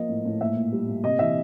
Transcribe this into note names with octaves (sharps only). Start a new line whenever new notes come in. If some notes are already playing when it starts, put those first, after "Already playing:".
Already playing: F3 A#3 D#5
A2
A2
A#2 E5
A#2
G3
A#2
C3 D#5
E3 E5